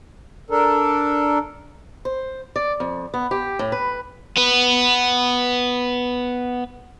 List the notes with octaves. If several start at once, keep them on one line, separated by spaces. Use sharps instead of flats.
D4 A4 A#4
C5
D5
F2
B3
G4
A2
B4
B3 B4